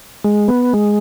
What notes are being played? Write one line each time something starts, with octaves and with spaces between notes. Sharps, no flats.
G#3
B3
G#3